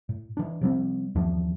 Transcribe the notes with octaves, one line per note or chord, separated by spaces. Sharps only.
A2
E3 D4
C3 F3 G3 C4
D#2 E3 F3 D4